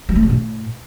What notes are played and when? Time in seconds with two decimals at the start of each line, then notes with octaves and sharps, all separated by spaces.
0.09 G3
0.16 A3
0.23 C#3
0.29 A2